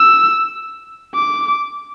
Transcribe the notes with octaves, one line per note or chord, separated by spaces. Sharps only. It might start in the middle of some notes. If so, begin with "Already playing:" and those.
Already playing: E6
D6